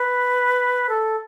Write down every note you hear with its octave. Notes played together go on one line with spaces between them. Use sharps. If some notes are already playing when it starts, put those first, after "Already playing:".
Already playing: B4
A4